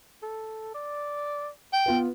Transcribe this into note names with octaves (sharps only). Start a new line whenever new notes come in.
A4
D5
G5
B3 F4 B4